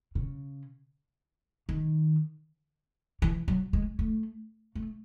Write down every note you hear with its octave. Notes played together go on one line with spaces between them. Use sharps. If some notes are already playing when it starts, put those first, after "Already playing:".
C#3
D#3
E3
F#3
G#3
A3
A3